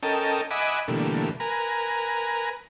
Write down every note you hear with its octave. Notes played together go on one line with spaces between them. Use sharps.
C#4 A4 A#4 D#5 G5 A5
D#5 E5 F#5 G#5 B5 D6
B2 D3 E3 G3 A3 A#3
A#4 B4 G#5 A#5